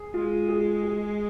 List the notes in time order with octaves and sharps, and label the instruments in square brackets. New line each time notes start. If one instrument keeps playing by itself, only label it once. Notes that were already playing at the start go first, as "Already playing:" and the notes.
Already playing: [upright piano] G#4
[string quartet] G#3 [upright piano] F4
[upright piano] G#4
G#4